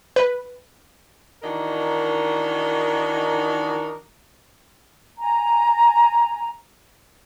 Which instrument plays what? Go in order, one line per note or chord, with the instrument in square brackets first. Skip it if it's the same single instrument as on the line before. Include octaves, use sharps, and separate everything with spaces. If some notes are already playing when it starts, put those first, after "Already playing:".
[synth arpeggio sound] B4
[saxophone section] D#3 E3 D4 D#4 F#4 A#4
[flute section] G#5 A#5